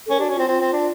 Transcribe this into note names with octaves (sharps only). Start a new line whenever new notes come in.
A4
C#4 A#4
D4 F#4 G4
C#4
C4 F4
C4 F4
C4
D4